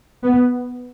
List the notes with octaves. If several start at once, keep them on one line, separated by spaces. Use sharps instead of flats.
B3